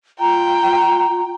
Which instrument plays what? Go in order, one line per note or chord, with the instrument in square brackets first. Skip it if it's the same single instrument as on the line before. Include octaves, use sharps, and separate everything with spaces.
[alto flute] F4 [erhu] G5 [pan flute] A#5